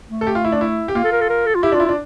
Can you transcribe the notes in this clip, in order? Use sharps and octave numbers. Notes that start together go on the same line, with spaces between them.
A3
A4
G4
F4
E4
D4
E4
G4
A#3 F4
A4
A#4
A4
A#4
A4
F4
E4 G4
D4
F4
E4
F4
D4